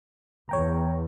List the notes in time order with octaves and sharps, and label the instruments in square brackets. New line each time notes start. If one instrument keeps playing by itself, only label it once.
[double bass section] E2 [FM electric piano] C#5 G5 A#5